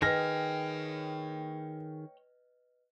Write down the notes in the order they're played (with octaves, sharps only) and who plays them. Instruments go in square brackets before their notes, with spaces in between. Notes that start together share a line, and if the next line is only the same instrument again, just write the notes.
[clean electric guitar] D#3 G#4 [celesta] B4 D#5 F6 [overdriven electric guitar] C#5 G5 [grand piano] A#6